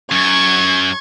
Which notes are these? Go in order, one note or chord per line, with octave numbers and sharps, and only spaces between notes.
F#2 C#6 G#6